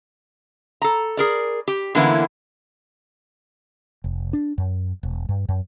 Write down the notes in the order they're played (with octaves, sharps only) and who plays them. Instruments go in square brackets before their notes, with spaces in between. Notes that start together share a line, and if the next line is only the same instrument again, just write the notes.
[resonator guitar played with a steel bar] A4 A#5
G#4 A#4 D5
G4
D3 E3 A#3 B3 C#4 E4
[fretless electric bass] F1
D4
F#2
E1
G2
F#2